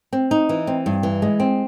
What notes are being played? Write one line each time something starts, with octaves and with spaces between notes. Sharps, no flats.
C4
D#4
E3
C4
G2
E3
G#3
C4